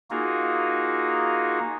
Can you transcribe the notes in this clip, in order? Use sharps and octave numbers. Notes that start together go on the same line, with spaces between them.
A#3 D#4 F4 F#4 G#4